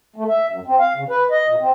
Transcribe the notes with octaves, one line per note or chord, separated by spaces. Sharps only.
A3
E5
F#2
C4
F5
C#3
B4
D#5
A#2
C4